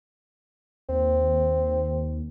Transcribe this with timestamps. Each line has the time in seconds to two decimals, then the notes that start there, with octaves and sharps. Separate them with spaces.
0.89 D#2 C4